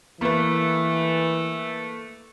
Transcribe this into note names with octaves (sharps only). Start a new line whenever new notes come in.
E3 A3 A#3 B4